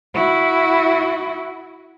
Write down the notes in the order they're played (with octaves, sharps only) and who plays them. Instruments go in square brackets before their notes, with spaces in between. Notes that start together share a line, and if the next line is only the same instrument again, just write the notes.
[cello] E4 F#4